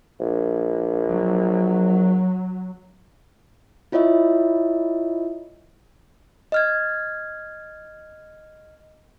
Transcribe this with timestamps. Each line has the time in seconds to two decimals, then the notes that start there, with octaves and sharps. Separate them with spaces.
0.20 A#1
1.09 F#3
3.92 E4 F4 C#5 D#5 E5
6.52 D#5 F6 G#6